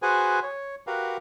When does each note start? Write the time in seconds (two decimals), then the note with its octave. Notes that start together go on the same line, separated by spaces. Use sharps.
0.02 F#4 G#4 B4 C5 G#5
0.43 C#5
0.87 F#4 G4 A#4 B4 F5